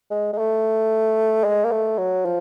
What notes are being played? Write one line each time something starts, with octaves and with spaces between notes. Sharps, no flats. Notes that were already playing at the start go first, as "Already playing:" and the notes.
G#3
G#3
A3
G#3
A#3
A3
F#3
F3